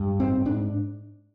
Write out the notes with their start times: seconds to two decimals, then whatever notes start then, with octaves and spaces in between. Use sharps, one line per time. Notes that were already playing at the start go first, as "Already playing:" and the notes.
Already playing: G2
0.20 G#2 C4
0.45 G#2 D4